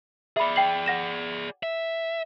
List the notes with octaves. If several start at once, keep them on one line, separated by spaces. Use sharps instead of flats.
G#4 D5 E5 B5
G5 C7 F#7
F#5 A#6 E7
E5